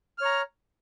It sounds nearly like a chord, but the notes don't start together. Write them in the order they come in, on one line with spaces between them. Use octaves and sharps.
F6 C#5 A#5